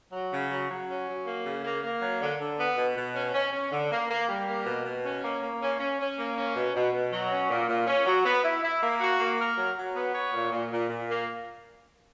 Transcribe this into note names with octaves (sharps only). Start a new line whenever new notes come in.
F#3
C#3
F#3
F#3
C#4
F#3
A#3
C#3
A#3
A#3
F#3
D3
D3
B3
B2
B2
C#4
C#4
C#4
D3
A#3
A#3
G3
A#3
B2
B2
C#4
A#3
A#3
C#4
C#4
C#4
A#3
C#4
B2
B2
B2
F#3
C#4
A#2
A#2
C#4
F#3
B3
E4
E4
A#3
F#4
A#3
A#4
F#3
F#3
B3
C#5
A#2
A#2
A#2
A#2
A#3